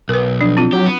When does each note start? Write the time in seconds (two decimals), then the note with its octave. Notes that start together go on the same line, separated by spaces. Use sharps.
0.09 B1 A#4 B4
0.41 F3 D4
0.57 C4 F4
0.73 F#3 G4
0.86 B3